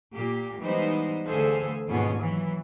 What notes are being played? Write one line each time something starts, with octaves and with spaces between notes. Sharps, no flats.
A#2 A#3 G4
E3 G3 G#3 B3 D#4 C5
D2 E3 G#4 A4 C5 F5
D#2 G#2 B2 C#4 F4 G#4
E3 F#3